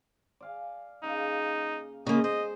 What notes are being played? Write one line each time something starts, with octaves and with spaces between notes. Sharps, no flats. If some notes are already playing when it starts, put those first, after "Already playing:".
D5 F5 G#5
C#3 A#3 D#4
C#3 G#3 A#3 G#4 D5 D#5
C5 D#5